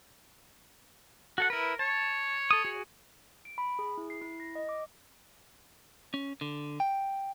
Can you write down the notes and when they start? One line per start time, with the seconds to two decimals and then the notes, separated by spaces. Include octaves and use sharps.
1.38 F#4 A4 F#5
1.50 E4 A#4 B4
1.79 C#5 A5
2.51 A4 D#6
2.65 F#4 G#4
3.45 D7
3.58 B5
3.79 G#4
3.98 E4
4.10 C7
4.22 E4
4.40 A#6
4.55 D#5
4.69 D6
6.14 C#4
6.41 D3
6.80 G5